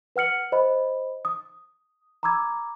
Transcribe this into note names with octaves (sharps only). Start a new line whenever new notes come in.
B4 F#5 F6 C#7 F#7
C5 D#5 B5
D#6
A#5 B5 D6 E6 G#6